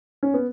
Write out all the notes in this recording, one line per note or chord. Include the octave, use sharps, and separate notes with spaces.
C#4
B3